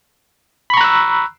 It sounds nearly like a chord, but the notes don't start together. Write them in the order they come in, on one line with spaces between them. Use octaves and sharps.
B5 C#6 A#5 F#6 E6